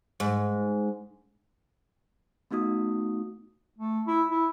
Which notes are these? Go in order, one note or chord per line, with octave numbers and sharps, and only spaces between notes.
G#2
A3 B3 D#4 F#4 D#6
A3
E4
E4